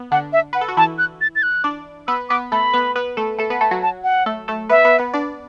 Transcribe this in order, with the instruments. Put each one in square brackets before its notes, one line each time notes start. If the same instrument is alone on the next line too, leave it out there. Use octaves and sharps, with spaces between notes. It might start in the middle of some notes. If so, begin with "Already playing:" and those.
Already playing: [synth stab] B3
[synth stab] D3 D4 [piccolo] F#5
[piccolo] E5
[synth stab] B4 [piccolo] F#5
[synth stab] A4
F#4
[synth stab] E3 E4 [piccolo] A5
[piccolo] F#6
A6
A6
F#6
[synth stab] D4 D5
[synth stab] B3 B4 [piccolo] E6
[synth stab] B3 B4 [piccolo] D6
[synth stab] A3 A4 [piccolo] B5
[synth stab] B3 B4
B3 B4
A3 A4
A3 A4
B3 B4
A3 A4
F#3 F#4
[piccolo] A5
F#5
[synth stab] A3 A4
A3 A4
[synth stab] B3 B4 [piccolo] E5
[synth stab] B3 B4
B3 B4
D4 D5